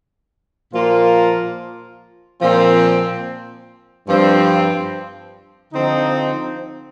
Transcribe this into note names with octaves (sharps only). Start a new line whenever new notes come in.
A#2 F3 A#3 F4
A#2 F3 C4
G2 F3 C4
D3 F3 C4 D#4